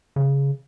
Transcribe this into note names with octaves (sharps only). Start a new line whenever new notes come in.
C#3